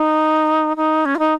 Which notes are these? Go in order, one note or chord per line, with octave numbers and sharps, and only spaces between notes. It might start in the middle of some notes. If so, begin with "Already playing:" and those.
Already playing: D#4
D#4
C#4
F4
D#4